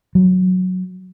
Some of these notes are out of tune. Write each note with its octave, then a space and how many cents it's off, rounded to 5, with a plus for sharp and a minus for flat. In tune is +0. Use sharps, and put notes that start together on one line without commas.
F#3 -5